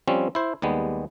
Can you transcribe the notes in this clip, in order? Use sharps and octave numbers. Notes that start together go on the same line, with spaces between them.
F3 G3 C4 C#4
E4 C5
D#2 G3 G#3 B3